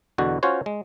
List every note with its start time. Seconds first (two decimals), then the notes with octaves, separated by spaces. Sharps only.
0.18 E2 B2 D3 F#4
0.43 C#4 F4 F#4 C5 C#5
0.66 G#3